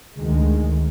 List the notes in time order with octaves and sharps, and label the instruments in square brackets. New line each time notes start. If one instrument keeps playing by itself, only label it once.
[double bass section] D2 D#3 G#3